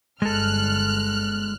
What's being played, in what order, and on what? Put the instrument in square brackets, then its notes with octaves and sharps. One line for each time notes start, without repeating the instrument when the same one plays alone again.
[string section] G1 F6 F#6 [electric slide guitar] G#3 A4